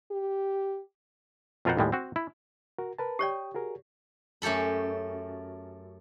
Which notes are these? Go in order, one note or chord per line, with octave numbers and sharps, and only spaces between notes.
G4
F2 B2 F4 A#4 C5 F#5
D#2 A2 G3 G#3
C4 F#4
E4
F#4 A#4
A#4 B4 A5
G4 C#5 D5 G5 D#6
F#4 G#4 A#4
F#2 A3 G4 A4 B5